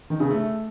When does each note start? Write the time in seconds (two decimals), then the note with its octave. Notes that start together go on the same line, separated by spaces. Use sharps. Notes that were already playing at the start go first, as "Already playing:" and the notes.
0.10 D#3
0.20 C#3
0.30 A3